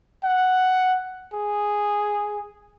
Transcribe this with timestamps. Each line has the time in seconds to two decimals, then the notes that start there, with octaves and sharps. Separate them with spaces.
0.24 F#5
1.34 G#4